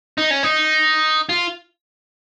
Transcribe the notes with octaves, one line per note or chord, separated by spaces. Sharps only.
D#4
C#4
D#4
F4